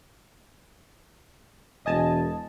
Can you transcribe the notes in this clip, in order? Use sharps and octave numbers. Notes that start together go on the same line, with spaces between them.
E1 D#5 G#5 A5